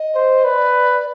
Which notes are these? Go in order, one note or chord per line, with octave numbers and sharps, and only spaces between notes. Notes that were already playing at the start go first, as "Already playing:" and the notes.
Already playing: D#5
C5
B4 D5